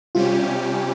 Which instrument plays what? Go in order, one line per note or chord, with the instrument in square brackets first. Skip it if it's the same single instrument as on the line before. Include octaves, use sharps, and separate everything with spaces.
[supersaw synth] C3 G3 C#4 G4 [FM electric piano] F4